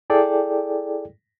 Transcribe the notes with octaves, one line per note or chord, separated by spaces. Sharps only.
E4 G#4 A4 D5 G5